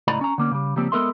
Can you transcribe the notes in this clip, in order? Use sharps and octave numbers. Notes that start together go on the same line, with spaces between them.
C#2 A2 D5 D#5 A#5 B5
C#4 A#5
D3 A#3 C#4
C#3 G3
C#3 F3 G3 A#3 C4 G4
G#3 B3 A4 A#4 E5 C6